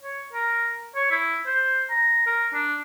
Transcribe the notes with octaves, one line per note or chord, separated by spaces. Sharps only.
C#5
A#4
C#5
E4
C5
A#5
A#4
D4